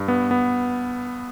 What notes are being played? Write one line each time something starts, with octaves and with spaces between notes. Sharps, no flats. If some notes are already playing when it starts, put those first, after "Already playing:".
Already playing: G2
B3
B3